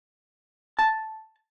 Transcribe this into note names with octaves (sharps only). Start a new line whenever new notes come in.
A5